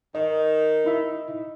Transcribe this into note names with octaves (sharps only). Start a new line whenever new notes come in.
D#3 D#5
D#4 E4 E5